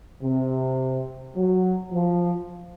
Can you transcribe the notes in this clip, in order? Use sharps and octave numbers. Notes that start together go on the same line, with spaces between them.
C3
F#3
F3